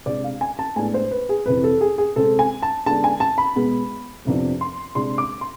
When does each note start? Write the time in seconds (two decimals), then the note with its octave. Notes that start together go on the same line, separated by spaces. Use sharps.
0.06 C3 G#3 D4 D5
0.24 F5
0.41 G#5
0.59 A5
0.76 A2 G#3 B3 D4 G#5
0.94 C5
1.11 B4
1.29 G#4
1.46 F2 C3 E3 B4
1.64 A4
1.81 G#4
1.98 G#4
2.16 C3 G#3 C4 A4
2.39 G#5
2.63 A5
2.86 D3 G#3 B3 D4 A5
3.04 G#5
3.20 A5
3.38 B5
3.56 B2 G#3 B3
4.25 F2 C3 F3 B3 D4
4.61 C6
4.95 C3 G#3 D4 C6
5.18 D6
5.41 C6